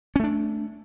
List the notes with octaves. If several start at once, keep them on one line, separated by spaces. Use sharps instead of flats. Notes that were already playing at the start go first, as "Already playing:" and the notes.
A3 C#4 D4